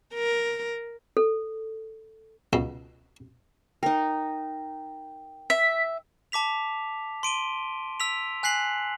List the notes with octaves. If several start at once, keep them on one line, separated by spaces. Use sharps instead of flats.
A#4
A4
C#2 B2
D#4 A#4 G5
E5 B6
A5 D6 B6 F7
C6 D7 D#7 G7
E6 B6 F7
G#5 F#6 B6 C7 F#7